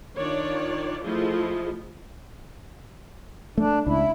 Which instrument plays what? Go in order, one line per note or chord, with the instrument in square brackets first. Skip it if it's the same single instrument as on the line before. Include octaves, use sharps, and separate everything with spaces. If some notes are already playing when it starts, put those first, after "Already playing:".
[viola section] D#3 D4 F4 C#5 D5
F3 A3 E4 F4 G#4 D#5
[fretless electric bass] A3 [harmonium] D4
[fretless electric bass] C#2 D4 [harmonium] E4